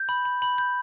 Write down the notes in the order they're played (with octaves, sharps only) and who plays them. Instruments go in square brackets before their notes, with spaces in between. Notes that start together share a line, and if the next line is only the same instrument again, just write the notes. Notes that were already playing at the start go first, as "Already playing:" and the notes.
Already playing: [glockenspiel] G6
B5
B5
B5
G6